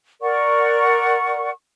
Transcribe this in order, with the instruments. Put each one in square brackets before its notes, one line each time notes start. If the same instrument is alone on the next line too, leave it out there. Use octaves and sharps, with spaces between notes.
[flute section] A#4 D5 F#5 C#6